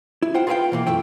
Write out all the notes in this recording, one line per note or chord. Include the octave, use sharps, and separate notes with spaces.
E4
F4 C5 F#5 G5
F4 G#4 B4 D#5 F5 G5
B2 E3 A#3
B1 F#2 A3 E4 G5